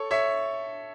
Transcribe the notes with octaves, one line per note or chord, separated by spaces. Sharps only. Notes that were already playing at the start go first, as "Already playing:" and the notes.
Already playing: A4 C#5
C#5 E5